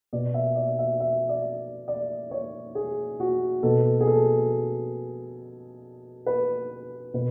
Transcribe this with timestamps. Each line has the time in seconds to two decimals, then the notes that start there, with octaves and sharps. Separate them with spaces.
0.13 B2 D5
0.34 E5
0.56 D5
0.79 E5
1.00 E5
1.29 D5
1.88 D5
2.31 C#5
2.75 G#4
3.20 F#4
3.63 B2 A4
4.01 G#4
4.07 A4
6.26 B4
7.14 B2 B4